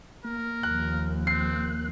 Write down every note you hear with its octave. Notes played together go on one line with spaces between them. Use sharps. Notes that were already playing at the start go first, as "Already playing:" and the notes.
A#3 A#4
D#2 F3 F#6
A#3 C4 F#6 C7